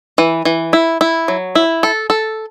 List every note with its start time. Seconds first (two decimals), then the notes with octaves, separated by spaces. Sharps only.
0.18 E3
0.45 E3
0.73 E4
1.01 E4
1.28 F#3
1.55 E4
1.83 A4
2.10 A4